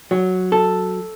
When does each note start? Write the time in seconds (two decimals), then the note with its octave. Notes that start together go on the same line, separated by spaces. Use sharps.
0.11 F#3
0.52 A4